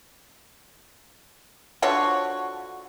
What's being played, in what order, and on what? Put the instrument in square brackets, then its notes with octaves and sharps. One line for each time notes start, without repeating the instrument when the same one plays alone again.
[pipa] D3 F3 F#4 C#5